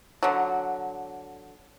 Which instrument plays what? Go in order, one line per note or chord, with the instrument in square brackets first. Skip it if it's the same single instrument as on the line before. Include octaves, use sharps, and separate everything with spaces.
[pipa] D3 F#3